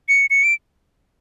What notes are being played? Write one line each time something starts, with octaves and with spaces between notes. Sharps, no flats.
C#7
C#7
D7